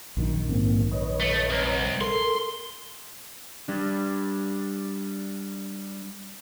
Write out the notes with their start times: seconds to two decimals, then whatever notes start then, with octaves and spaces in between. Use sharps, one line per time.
0.17 A#1 F#2 D#3
0.49 G#2 A#3 C4
0.92 B4 C#5 D#5
1.20 A3
1.50 C2
2.01 A4 A#4 C6
3.68 G3 D4